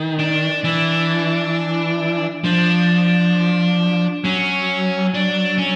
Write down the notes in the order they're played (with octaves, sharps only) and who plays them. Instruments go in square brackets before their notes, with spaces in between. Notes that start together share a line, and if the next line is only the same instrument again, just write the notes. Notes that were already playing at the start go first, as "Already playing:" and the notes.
Already playing: [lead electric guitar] D#3
[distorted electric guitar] D4
[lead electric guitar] E3 [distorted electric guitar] D4
[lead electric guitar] F3 [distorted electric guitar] D4
[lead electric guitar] F#3 [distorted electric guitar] C#4
[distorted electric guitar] D4
C#4